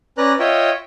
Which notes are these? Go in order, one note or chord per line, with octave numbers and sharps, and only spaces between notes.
C#4 B4 D5 A#5 F#6
F4 C#5 D#5 E5 G5